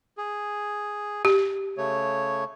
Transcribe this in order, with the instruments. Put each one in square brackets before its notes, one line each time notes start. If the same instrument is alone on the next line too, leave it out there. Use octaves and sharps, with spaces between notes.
[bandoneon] G#4
[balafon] G4
[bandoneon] C#3 A3 C#5